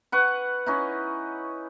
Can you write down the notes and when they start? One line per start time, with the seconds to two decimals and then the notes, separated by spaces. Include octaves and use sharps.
0.12 B4 F#5 C#6
0.66 C#4 D#4 E4